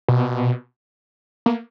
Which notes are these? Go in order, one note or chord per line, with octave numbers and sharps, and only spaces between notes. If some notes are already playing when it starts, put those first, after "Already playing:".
B2
A#3